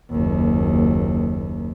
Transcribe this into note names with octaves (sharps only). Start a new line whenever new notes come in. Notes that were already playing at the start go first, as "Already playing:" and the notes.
F#1 D#2